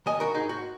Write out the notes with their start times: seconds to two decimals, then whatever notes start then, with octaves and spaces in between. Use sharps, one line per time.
0.06 D#3 D#5 G#5
0.20 F#4 A#4
0.34 G#2 D#4 G#4
0.49 F#4